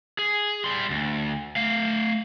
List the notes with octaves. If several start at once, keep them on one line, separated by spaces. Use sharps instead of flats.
G#4
G3 C6
D2
A3 F5